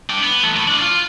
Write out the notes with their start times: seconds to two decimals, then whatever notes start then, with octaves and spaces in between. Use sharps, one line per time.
0.10 D4 G5
0.23 B3
0.43 E3 A3
0.56 A2
0.68 D4 F5
0.82 F4